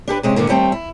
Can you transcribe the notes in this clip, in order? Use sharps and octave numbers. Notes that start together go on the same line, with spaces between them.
D4 G4 A4 B4
C3 G#3 C4 C#4
G#2 D3 D#3 A#3
D#2 G3 A3 C4 G5
E4